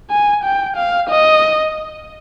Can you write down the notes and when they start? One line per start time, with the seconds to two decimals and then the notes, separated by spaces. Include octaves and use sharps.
0.11 G#5
0.44 G5
0.77 F5
1.10 D#5